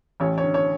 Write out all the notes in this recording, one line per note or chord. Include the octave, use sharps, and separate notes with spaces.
A1 C#5
C#5
D3
C#5